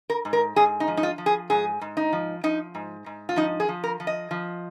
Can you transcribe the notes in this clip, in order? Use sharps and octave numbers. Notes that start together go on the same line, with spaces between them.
A#4
G#2
A#4
G#2 G#4
D#4
F3
D#4
F4
F3
G#4
G#2 G#4
G#2
D#4
F3
F3 D#4
G#2
G#2
F4
F3 D#4
G#4
F3
A#4
F3
D#5
F3